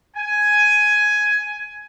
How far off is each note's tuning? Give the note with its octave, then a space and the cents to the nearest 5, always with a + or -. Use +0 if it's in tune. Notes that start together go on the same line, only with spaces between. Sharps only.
G#5 +10